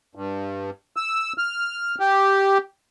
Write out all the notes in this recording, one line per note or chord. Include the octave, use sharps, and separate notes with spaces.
G2
E6
F6
G4